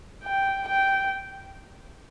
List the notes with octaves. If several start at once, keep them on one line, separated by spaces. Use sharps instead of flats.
G5
G5